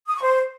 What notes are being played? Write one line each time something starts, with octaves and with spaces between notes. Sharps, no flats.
D#6
C#6
C5